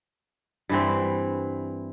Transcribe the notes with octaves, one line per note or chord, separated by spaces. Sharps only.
G2 E3 C4